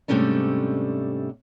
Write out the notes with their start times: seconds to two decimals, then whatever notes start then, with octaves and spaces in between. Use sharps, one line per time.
0.08 G#2 C3 G3 A3 C#4 D4